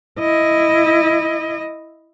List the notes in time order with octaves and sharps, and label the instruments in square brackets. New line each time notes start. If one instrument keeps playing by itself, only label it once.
[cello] E4 D#5